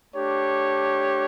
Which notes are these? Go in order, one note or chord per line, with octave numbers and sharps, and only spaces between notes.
A3 D4 G4 C#5